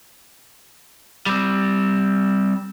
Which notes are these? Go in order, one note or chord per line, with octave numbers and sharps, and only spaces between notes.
G3 C4